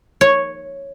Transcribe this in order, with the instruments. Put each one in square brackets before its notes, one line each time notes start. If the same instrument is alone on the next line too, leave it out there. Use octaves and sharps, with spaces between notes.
[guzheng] C#5